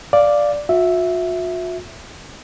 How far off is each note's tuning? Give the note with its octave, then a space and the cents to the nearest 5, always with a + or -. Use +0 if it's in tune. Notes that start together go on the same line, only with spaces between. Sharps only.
D5 +0 F5 +0
F#4 -45 E5 +0